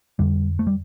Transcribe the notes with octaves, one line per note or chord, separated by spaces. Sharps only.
F2 D3 G3
A3
G3